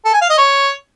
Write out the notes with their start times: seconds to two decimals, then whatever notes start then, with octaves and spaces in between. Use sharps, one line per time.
0.05 A4
0.13 G#5
0.22 F5
0.30 D#5
0.38 C#5